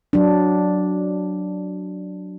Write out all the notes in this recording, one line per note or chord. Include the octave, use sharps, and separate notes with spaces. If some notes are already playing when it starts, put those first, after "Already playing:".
F#3 D4